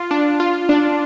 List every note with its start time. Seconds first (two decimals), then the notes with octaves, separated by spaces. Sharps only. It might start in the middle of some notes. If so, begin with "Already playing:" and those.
Already playing: F4
0.11 D4
0.40 F4
0.69 D4